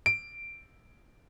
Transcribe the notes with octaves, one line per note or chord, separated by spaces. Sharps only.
D7